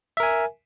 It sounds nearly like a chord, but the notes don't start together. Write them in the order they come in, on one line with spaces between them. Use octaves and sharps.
E5 A#4 G#5